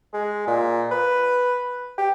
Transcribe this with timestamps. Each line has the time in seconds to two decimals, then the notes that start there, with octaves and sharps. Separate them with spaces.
0.13 G#3
0.47 A#2
0.91 B4
1.98 G4